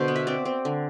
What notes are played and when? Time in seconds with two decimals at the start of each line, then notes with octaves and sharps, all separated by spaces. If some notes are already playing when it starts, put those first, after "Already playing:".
Already playing: B2 D3 C5
0.08 B3
0.16 E5
0.27 C4 D5
0.45 C4
0.65 D3